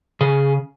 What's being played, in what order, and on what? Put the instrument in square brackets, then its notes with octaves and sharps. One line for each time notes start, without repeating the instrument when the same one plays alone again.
[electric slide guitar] C#3 G#4